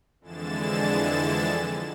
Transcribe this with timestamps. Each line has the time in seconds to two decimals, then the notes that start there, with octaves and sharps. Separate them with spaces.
0.21 F2 D3 E3 G#3 A6 E7